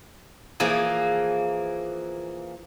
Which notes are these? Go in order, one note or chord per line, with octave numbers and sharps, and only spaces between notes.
E3 F3 A#3 G#4